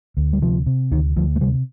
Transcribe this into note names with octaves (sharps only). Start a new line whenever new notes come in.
D2
G3
C3 F3
C3
D2 D#3
D2 F3
A3
C3 G3